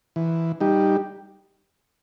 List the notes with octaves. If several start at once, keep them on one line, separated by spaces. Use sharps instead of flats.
E3
G3 D#4 G4